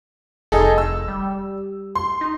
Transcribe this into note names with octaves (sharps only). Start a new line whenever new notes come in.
F1 D#4 G#4 A4
E6
G3
C6
D#4